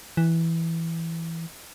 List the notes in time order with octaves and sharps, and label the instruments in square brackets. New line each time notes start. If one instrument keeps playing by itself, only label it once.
[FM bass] E3